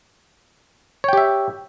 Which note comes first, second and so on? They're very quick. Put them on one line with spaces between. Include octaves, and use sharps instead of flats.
C#5 G5 G4 E5